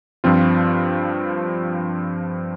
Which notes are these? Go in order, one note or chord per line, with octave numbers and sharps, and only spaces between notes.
G2 F3 C4 F4